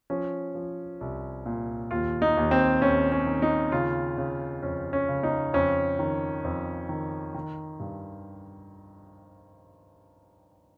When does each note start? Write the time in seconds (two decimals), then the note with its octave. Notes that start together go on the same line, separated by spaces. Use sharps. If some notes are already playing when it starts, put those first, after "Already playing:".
0.10 F3 C#4
0.55 F3
1.01 C2
1.46 A#2
1.91 D#2 F4
2.22 D#4
2.37 D#2
2.51 C4
2.81 D#2 C#4
3.12 C#4
3.26 D#3
3.42 D#4
3.72 C#3 F4
4.18 C#3
4.63 F2 C#4
4.93 C#4
5.09 C#3
5.23 D#4
5.54 F2 C#4
5.99 D#3
6.45 F2
6.89 D#3
7.34 D#3
7.80 G2